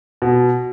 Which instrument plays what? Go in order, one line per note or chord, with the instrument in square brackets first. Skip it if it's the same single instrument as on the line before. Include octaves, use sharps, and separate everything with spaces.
[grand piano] B2